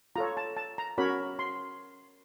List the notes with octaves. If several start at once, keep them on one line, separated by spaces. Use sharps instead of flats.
F4 A4 C#5 A#5
A5
A5
A#5
C#4 F#4 A#4 C#5 B5
C6